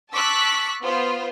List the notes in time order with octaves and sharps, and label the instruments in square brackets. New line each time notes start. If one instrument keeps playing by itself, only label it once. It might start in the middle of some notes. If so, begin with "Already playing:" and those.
[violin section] A5 C#6 D6 E6 F#6 B6
B3 F4 C5